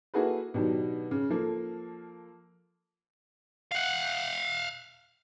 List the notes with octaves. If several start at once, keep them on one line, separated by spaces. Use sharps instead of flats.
A#3 E4 F#4 G#4 A4 B4
B2 D#3 F#3 D4 G4
C#3
F3 A#3 A4
F5 F#5